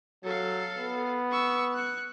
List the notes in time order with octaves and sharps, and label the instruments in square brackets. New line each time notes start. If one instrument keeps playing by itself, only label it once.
[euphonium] F#3 [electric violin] A4 F5
[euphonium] B3
[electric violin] C#6 E6
F#6 C#7